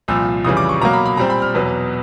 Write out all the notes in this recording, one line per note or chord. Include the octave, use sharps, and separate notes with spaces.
C2 A#2 F3 E6
F2 C#3 E3 G3 D#6
D6
C#6
B2 F#3 A#3 A#5
B5
B5
A#2 G3 C4 A#5
B5
F6
E2 B2 F#3 B3